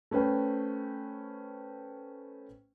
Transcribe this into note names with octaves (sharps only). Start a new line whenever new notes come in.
A3 C#4 B4 C5 G5